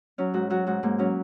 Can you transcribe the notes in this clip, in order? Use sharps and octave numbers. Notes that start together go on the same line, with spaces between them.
F#3 C#4
G#2 F#4
F#3 F#4
G#2 F#4
G#2 A#3
F#3 C#4